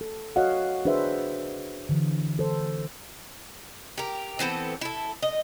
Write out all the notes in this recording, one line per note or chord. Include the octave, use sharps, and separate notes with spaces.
A4
F#4 C#5 D#5 F5 F#5
D4 G#4 B4 C5 E5
D3 E3
A4 C5
G4 A#4
E3 B3 C4 A4
E4 A4
D#5